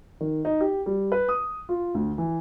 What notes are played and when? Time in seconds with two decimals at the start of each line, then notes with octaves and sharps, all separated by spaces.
0.21 D#3
0.45 D#4
0.61 G4
0.86 G3
1.12 B4
1.28 D#6
1.69 F4
1.94 D2
2.18 E3